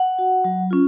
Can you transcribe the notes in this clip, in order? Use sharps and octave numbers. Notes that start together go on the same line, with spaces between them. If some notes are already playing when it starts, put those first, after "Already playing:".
Already playing: F#5
F#4
F#3
C#4 F4